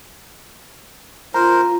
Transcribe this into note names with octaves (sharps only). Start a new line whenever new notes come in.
F4 A#4 C5 A#5